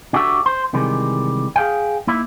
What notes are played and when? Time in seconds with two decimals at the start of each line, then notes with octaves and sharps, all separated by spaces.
0.13 D4 F#4 G4 A4 E5
0.46 C5
0.73 C3 D#3 E3 G3 G#3
1.56 G#4 F5 G5
2.07 A#3 D#4 E4 E5